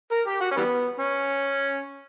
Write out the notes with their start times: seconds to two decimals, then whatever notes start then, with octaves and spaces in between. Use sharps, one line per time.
0.11 A#4
0.27 G4
0.41 F#4
0.51 C#4
0.56 E3 G3 B3
1.00 C#4